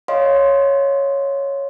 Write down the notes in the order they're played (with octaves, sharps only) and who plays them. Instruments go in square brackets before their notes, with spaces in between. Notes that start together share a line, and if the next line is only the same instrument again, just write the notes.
[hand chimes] C#5 D#5 F5 C6